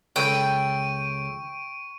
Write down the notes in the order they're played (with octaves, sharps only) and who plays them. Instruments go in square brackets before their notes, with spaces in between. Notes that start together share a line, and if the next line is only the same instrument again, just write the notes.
[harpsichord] C#2 A4 B5 [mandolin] G5 [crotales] C#6 D7 D#7